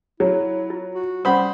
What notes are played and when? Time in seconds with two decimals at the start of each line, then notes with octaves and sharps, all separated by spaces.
0.20 F#3 E4
0.70 F4
0.95 F#4
1.25 G3 C#4 C5 F#5 B5 D#6